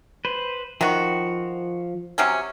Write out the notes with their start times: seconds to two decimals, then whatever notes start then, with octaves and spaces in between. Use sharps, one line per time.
0.25 B4 C5
0.81 D#3 F3 F#4
2.18 C3 F#3 C#4